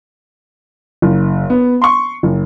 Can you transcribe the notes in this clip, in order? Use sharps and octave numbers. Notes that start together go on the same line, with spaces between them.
F#1
B3
C6 C#6
F#1